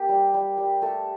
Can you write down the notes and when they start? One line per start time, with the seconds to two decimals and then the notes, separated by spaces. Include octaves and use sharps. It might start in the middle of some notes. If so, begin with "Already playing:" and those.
Already playing: A#3 G4
0.09 G3
0.34 G3
0.58 G3
0.82 A3 A4